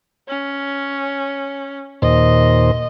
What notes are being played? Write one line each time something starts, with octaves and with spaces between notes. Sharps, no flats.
C#4
D#2 A#2 C5 D#5